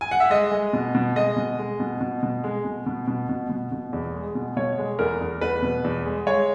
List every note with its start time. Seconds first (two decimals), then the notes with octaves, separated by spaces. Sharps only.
0.01 G#5
0.11 F#5
0.20 E5
0.30 G#3 D#5
0.52 G#3
0.73 B2
0.95 B2
1.16 G#3 D#5
1.36 B2
1.59 G#3
1.80 B2
2.01 B2
2.23 B2
2.44 G#3
2.65 B2
2.86 B2
3.08 B2
3.29 B2
3.49 B2
3.72 B2
3.93 E2
4.14 G#3
4.35 B2
4.56 B2 C#5
4.78 G#3
4.99 E2 A#4
5.21 E2
5.41 E2 B4
5.62 B2
5.84 E2
6.06 G#3
6.27 G#3 C#5